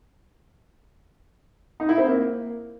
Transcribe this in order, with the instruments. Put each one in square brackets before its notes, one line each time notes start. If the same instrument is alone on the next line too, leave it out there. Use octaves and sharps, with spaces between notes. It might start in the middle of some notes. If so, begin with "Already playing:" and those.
[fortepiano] D#4
E4
C4
A#3